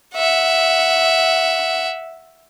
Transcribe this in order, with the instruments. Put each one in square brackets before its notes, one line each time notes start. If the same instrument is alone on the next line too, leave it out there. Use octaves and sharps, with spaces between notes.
[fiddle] E5 F#5